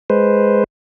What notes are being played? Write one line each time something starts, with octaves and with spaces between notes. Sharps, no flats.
G#3 B4 C5